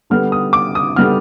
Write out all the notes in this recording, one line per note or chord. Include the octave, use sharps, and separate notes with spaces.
D3 G3 B3 F6
D#6
D6
D#6
D3 G3 B3 F6